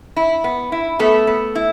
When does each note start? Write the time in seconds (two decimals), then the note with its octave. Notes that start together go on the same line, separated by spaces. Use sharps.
0.16 E4
0.44 B3
0.72 E4
0.99 A3 B3 A4
1.27 B3
1.55 E4